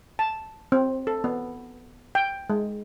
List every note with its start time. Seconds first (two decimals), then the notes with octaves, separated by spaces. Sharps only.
0.19 A5
0.72 C4
1.07 A4
1.24 B3
2.15 G5
2.50 G#3